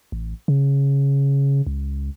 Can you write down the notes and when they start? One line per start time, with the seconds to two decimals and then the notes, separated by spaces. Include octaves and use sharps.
0.12 A1
0.48 C#3
1.67 C#2